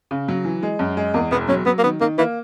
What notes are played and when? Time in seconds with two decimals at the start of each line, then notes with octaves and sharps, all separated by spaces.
0.11 C#3
0.28 F#3
0.45 E3
0.63 G#3
0.79 F#2
0.97 G#3
1.14 E2 A#3
1.31 E1 B3
1.48 F#3 C#4
1.66 F#3 B3
1.79 A#3
1.84 D#3 B3
2.01 D#3 A#3
2.18 E3 A#3